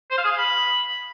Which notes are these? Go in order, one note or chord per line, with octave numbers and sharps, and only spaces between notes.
C5
F5
G#4
F5
B5